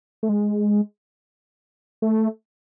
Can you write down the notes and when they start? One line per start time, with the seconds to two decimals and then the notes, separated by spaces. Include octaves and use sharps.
0.23 A3
0.29 G#3
2.02 A3